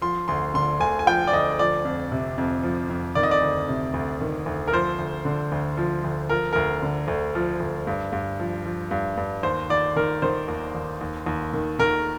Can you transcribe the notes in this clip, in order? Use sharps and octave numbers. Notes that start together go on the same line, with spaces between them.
F3 C6
D2 C6
D3 C6
D2 G#5
G#5
F3 G5
D5
D2 D#5
F3 D5
F2
C3
F2
F3
F2
D#3 D5
D#5
D5
D2
C3
D2
D#3
D2
A#4
F3 C5
D2
D3
D2
F3
D2
F3 A#4
D2 A#4
D3
D2
F3
D2
G2
G2
F3
F3
G2
G2
D#2 C5
D#2 D5
D#3 A#4
D#3 C5
D#2
D#2
D#2
D#2
D#3
D#3 A#4